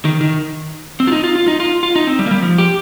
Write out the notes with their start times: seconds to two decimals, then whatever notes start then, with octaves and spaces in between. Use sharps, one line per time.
0.05 D#3
0.21 D#3
1.00 C4
1.07 F4
1.12 D#4
1.24 F4
1.36 F4
1.48 D#4
1.60 F4
1.83 F4
1.96 D#4
2.07 C4
2.19 G3
2.26 A#3
2.31 G3
2.42 F3
2.58 G4